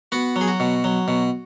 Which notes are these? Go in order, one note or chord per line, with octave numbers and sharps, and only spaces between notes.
B3 F#4
F#3
G#4
F#4
B2
F#3
B2